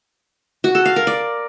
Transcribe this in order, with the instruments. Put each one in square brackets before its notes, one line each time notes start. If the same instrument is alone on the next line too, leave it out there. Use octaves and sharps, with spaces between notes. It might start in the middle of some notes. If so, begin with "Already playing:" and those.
[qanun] F#4
A4
F5
A#4
D5